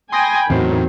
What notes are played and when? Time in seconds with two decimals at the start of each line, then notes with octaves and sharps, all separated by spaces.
0.12 G5 G#5 B5 C6 D#6 A#6
0.50 E2 A2 D#3 F#3 C4 C5